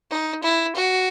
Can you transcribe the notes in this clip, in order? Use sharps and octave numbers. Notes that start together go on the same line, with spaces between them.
D#4
E4
F#4